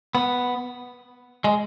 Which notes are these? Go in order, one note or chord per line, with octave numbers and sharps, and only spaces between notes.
B3
G#3